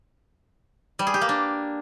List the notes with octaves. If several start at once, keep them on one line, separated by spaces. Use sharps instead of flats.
G3
G#4
G4
A#3
D4